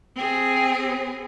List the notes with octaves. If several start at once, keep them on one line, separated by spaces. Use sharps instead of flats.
C4 G#4